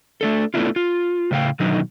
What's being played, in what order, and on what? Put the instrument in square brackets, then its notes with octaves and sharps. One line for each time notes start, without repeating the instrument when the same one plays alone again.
[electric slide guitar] A3 D4 A4
A3 B3 D4 E4 F4
F4
A2 C#3 A3 B4 F5 G5
B2 D3 D#3 F#3 D#4